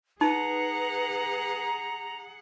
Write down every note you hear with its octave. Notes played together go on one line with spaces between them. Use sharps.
D#4 G#4 B4 F#5 A#5